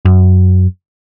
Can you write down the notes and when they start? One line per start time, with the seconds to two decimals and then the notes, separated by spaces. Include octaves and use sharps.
0.05 F#2